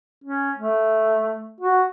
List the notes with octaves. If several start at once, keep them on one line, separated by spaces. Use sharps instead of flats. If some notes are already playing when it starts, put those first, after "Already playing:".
C#4
A3
F#4